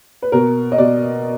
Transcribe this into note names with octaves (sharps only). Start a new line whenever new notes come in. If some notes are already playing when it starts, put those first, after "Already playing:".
B4
B2 A#4
D#5
B2 D5